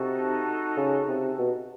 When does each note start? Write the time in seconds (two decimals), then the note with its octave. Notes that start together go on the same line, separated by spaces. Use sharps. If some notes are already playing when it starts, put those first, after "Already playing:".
Already playing: C3 D#4 F#4 A4
0.77 C#3
1.08 C3
1.38 B2